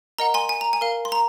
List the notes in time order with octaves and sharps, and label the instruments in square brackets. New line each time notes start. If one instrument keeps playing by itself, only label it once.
[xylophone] A#4 D#5 F#5 A#5
G#5 C6
G#5
A#5
G#5
A#4 F5
C6
A#5